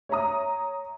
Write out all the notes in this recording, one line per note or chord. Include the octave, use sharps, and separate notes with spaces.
C#5 E5 A#5 D#6